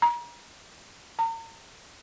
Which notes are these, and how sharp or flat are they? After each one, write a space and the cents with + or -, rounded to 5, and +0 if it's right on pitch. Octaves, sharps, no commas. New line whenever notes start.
A#5 +35
A#5 -40